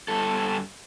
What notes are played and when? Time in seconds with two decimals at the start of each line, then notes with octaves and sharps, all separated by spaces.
0.08 G2 A4